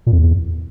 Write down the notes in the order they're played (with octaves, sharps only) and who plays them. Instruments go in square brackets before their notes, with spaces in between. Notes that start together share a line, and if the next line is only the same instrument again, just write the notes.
[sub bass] A#2
F2
E2